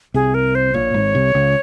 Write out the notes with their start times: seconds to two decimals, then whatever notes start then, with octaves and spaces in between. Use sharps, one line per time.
0.14 C2 C3 G#4
0.34 A#4
0.55 C5
0.74 A#1 A#2 C#5
0.94 G#1 G#2
1.15 C2 C3
1.35 C#2 C#3